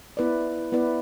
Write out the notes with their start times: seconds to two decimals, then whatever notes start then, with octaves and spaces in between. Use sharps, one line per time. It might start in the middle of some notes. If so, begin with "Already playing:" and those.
0.17 B3 E4 B4 D5
0.72 B3 E4 B4 D5